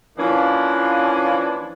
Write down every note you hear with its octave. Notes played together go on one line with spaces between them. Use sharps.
E3 F3 A#3 C#4 D4